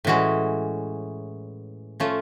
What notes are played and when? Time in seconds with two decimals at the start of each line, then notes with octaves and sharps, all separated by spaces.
0.04 A2 E3 G#3 C#4 F#4
2.00 F3 A3 C#4 F4